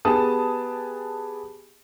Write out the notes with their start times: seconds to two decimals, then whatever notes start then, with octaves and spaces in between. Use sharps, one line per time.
0.05 B3 G4 G#4 A5 D#6